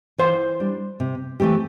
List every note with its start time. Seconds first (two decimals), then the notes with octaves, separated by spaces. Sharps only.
0.18 E3 C5
0.60 G3 D4
1.00 C3
1.40 E3 A3 C4 G4